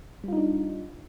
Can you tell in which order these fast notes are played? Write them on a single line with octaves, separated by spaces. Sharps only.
G3 F4 D#4 D4